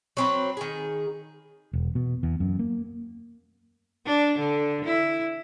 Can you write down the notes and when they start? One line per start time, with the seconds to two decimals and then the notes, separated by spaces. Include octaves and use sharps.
0.17 F#3 C4 B4
0.57 D#3 G#4
1.73 E1
1.95 B2
2.23 E2
2.40 F#2
2.59 A#3
4.06 D4
4.38 D3
4.85 E4